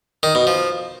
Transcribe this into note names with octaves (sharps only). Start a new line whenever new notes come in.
D#3
B2
F3